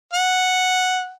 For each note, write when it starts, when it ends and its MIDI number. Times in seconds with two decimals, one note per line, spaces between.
0.14 1.11 78